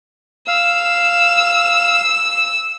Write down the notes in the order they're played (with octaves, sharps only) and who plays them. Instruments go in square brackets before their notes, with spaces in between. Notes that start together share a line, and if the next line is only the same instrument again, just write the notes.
[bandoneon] F5 [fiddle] E6